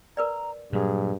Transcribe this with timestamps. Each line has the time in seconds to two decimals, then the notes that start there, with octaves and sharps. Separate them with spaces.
0.17 A#4 B4 D5 A#5
0.73 G2 A#2 F#3 G#4